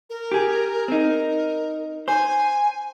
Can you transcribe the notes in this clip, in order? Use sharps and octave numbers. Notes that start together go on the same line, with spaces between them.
A#4
G4 G#4
C4 D#4 A#4
C5 G#5